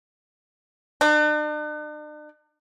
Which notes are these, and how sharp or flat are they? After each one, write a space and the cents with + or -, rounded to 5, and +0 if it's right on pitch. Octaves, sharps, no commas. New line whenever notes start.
D4 +45